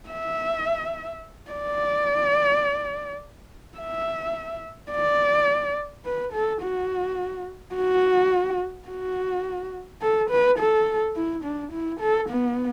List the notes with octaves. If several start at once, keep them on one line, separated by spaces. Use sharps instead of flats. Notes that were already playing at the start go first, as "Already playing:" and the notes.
E5
D5
E5
D5
B4
A4
F#4
F#4
F#4
A4
B4
A4
E4
D4
E4
A4
B3